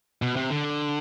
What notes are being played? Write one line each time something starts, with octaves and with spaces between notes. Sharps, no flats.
B2
C3
D3